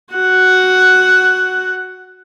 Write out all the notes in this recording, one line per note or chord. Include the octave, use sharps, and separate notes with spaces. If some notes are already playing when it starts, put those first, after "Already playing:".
F#4 F#5